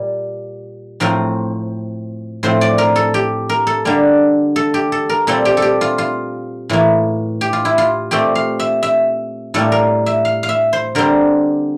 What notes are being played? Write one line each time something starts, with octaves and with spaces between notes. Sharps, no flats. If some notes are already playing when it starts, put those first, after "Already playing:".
Already playing: A#2 G3
A2 F3 A3 C4 A#4
A2 F3 C4 C5
D5
A#4
A4
G4
A#4
A4
D3 G3 A#3
A4
G4
A4
A#4
A#2 G3 C4 A4
G4
A4
G4
F4
F4
A2 E3 A#3
G4
F4
E4
F4
A#2 A3 C4 G4
F5
E5
E5
A2 G3 A#3 A4
A#4
E5
F5
F5
E5
C5
D3 G3 C4 A#4